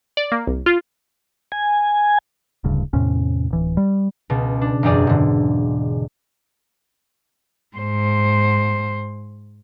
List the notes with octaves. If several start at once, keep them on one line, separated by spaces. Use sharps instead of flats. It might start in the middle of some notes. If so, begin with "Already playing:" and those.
D5
A#3
C2
F4
G#5
D1 D2 G2 C#3
E2 A2 C3 C#4
D1 E3
G3
C#2 B2
D4
E1 F#2 G4 G#4 D5
G#2 D3
G#2 C5